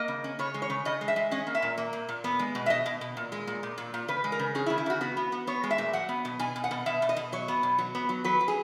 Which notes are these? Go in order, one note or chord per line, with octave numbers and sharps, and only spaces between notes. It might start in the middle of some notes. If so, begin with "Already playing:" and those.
Already playing: A#3 D#5
C#3
C#4
C#3 C#5
G#3
C#5
C#3
C#3 D#5
G#3
E5
G#3
C#4 D#5
A#3
E5
A#2
A#3
A#2
A#2
B3
G#3
B2
E5
B2 D#5
B2
B2
A#2
G#3
A#2
A#2
A#2
A#2
C#3 B4
G#3
A#4
C#3
C#4 G#4
E4
C#3
E4
C#3 F#4
B3 F#4
B3
B3
B3 C#5
G#3
E5
A#2
F#3 F#5
B3
B2
B2 G#5
B2
F#5
B2
B2 E5
B2
D#5
B2
F#3 C#5
B3
B2
F#3
B3
F#3
F#3 B4
F#3
G#4